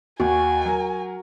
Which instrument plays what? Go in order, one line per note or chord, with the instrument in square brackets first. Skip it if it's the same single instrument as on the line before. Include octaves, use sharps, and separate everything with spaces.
[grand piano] D#2 [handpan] F#4 [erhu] G#5
[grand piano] F#3 A#4